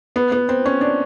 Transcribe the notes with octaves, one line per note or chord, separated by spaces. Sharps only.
B3
B3
C4
C#4
D4